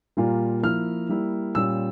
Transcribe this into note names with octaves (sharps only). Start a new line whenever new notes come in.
A#2 G3 A#3 F4
F3 A#3 E4 F6
G3 A#3 E4
A#2 G3 C#4 F4 E6